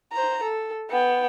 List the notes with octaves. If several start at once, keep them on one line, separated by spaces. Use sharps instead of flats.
C5 A#5
A4
B3 G5